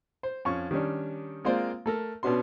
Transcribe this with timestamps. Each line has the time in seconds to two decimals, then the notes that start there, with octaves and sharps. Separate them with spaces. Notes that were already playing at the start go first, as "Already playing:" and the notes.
0.23 C5
0.45 F2 C#4 C#6
0.71 D#3 G3 C#4 D4
1.45 G#3 A#3 C4 F4 C5 D5
1.86 A3 A4 A#4
2.23 B2 B3 C#4 D4 F#4 C6